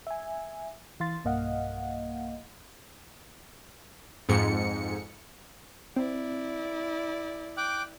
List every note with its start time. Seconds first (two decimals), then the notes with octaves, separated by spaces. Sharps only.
0.07 E5 G#5
1.00 E3 F5 C6 A6
1.24 B1 G2 A#3 D#5 F5 F#5
4.29 F2 G#2 C#7
5.96 C4 E4 D5
7.57 G5 D6 F#6